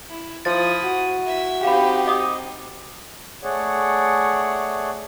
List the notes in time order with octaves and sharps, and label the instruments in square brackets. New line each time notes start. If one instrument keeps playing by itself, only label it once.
[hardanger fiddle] E4
[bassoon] F3 [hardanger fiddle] E4 D#6 [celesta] A6
[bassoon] F#4
[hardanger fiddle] E4 E5
[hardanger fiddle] C4 D#4 [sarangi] G4 [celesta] F5 B5
[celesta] D#5 D6 D#6
[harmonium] A3 G#4 C#5 D5 F#5